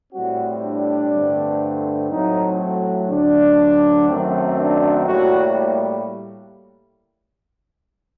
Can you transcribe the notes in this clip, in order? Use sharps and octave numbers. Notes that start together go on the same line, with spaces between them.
A2 G3 C4 F#4
D4
G2 D3 A3 C4
A2 F#3 A3 C4 D#4
F#4
D2 D3 F#3 D4
F#2 D#3 F#3 A3 C4
D4
A2 G3 A#3 F#4